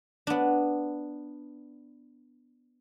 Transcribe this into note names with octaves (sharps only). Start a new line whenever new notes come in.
B3 D4